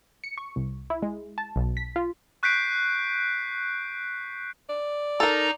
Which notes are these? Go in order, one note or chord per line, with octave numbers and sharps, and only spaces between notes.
C#7
C#6
C2
E4
G#3
A5
B1
B6
F4
C#6 F#6 G6 B6 C7 D7
D5
D#4 A4 A#4 A#5